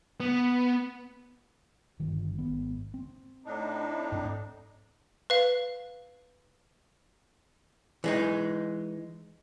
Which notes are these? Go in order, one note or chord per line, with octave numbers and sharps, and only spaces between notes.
B3
G1 G2 D#3
G#1 B3
C4
A2 D4 D#4
G#2 C4
B4 F5
E3 G#3 D#4